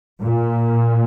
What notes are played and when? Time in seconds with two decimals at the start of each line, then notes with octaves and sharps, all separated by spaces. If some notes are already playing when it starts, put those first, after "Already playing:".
0.22 A#2